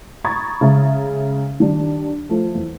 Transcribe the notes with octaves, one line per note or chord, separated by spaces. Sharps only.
A#5 B5 C#6 D#6 G#6 A6
C#3 G#3 E5 A#5
D#3 G3 D4
F3 A3
E2